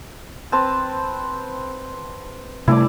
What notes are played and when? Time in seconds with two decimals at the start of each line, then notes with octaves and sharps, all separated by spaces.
0.52 C4 B4 A5
2.68 C3 G3 A3 E4 D5